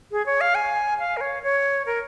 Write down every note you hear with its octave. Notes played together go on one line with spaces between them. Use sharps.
G#4
C#5
F5
G#5
F5
A#4
C#5
C#5
A#4